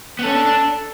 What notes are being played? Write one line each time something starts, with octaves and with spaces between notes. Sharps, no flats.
B3
C#4 A4
D4
D4